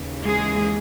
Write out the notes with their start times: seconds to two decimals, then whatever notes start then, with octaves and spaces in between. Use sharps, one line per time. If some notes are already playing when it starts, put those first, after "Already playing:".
Already playing: D#2 C#3 E3
0.25 G#3 G#4